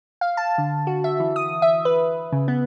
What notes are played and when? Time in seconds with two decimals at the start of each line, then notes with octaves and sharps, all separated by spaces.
0.21 F5
0.37 A5
0.58 D3
0.87 F#4
1.04 E5
1.20 E3
1.36 D#6
1.62 E5
1.85 B4
2.32 C#3
2.48 B3